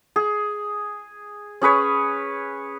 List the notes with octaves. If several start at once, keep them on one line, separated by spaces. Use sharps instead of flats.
G#4
C#4 G#4 B4 C#5